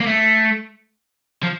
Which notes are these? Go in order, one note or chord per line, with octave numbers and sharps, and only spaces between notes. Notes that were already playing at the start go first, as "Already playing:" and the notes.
A#3
A3
F3